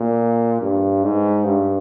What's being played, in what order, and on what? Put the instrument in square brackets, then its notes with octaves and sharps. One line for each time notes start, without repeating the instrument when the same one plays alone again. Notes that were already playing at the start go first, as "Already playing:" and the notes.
Already playing: [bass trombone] A#2
G2
G#2
G2